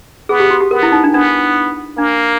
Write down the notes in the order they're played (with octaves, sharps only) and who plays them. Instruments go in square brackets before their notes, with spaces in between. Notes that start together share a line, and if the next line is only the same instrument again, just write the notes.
[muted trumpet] B3 [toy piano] G#4
[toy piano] G4
F#4
G4
[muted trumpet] B3 [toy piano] A#4
[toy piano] E4
D#4
D4
[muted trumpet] B3 [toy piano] D4
[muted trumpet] A#3 [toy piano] D4